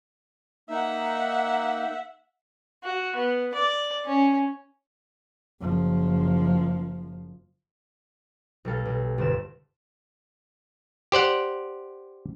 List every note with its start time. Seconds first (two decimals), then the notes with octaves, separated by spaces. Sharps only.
0.70 A#3 D#4 E5 F#5
2.83 F#4
3.15 B3
3.54 D5
4.05 C#4
5.61 F#1 F3
8.65 B1 G3 A4 F5
8.85 B1
9.18 G1 D2 C4 E7
11.12 G4 C5 D5 F#5